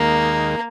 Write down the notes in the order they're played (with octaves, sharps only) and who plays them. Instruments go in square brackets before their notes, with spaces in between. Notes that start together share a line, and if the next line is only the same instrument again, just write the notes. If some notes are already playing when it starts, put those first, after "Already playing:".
Already playing: [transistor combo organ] D#2 D#3 G#3 [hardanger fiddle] A#3